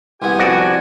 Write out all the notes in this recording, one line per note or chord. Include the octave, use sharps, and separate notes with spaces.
C2 B3 G4 G#5
F2 F#4 D5